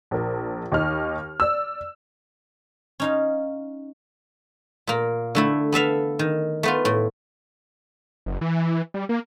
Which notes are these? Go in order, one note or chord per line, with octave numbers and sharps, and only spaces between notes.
A#1 A#4
D#2 D#4 F6
D5 E6
C#4 D#4 F5
A#2 A#3
D3 A3 E4
B3 A4 E5 F5
D#3
A3 B3 F4
A2
F#1
E3
G3
A#3